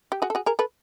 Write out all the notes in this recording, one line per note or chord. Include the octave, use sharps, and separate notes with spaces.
G4
F#4 G#4
A4
F#4 G#4
G#4 A#4
A4 B4